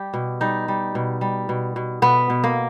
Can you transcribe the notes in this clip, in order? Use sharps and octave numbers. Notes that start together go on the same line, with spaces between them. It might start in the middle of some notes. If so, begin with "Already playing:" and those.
Already playing: G3 G4
B2
G3 D#4
G3
B2
G3
B2
B2
B2 B3
B2
A#3